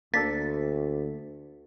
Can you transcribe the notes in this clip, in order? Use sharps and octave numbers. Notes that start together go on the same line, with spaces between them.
D2 A#3 D4 A4 A6 B6